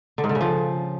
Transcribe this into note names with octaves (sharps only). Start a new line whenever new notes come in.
D3
G#2
D3
C#3
F3